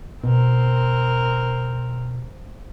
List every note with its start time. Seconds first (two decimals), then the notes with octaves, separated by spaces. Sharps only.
0.24 B2 C4 A#4